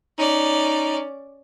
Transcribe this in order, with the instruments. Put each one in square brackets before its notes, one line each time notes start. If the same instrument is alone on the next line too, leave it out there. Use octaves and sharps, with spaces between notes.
[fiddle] C#4 D5 [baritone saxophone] D#4